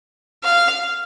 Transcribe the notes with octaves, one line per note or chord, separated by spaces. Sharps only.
F5